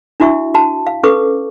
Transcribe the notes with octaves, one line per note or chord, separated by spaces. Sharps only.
D4 E4 F#4 E5 C#6
F#4 A5
F5
C#4 A4 B4 C#6 D6